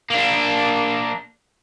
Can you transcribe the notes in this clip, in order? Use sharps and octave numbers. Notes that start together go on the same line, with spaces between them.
A#3 D4